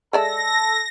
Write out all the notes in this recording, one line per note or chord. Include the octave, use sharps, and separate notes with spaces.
G#3 A4 D5 E5 A#6